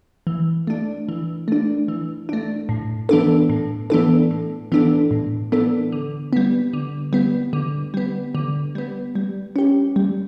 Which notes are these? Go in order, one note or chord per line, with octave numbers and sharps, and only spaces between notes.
E3
A3 D4
E3
A3 D4
E3
A3 D4
A2
E3 B3 D4 A4
A2
E3 B3 D4 A4
A2
E3 B3 D4 A4
A2
E3 B3 D4 A4
D3
G3 B3
D3
G3 B3
D3
G3 B3
D3
G3 B3
G3
C#4 G4
G3